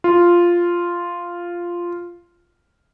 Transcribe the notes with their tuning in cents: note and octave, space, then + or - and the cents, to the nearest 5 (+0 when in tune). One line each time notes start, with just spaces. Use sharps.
F4 -5